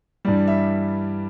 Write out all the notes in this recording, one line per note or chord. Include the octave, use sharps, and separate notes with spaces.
G2 E3 G3 D5
E5